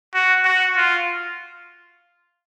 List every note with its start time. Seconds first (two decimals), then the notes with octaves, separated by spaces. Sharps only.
0.14 F#4
0.44 F#4
0.76 F4